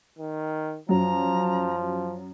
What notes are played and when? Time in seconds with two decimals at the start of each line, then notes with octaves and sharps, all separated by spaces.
0.18 D#3
0.89 F#2 F3 F#3 A#5